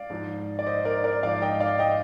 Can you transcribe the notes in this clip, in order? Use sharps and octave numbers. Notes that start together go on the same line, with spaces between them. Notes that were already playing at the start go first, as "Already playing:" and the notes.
Already playing: D5 F5
G#2 F3
D5
C5 D#5
A#4 D5
A#4 D5
G#2 F3 D5 F5
D#5 G5
D5 F5
D#5 G5